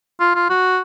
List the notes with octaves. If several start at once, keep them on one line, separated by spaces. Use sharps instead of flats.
F4
F4
F#4